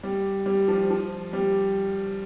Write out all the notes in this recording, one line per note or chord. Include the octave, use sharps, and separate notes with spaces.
G3
G3
F3
F3
G3